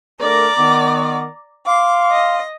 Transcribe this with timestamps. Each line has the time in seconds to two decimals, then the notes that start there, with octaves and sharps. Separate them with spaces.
0.22 D3 A3 A#4 D5 A#5 D6
0.58 D#3 B3
1.67 F5 C6 D6
2.12 D#5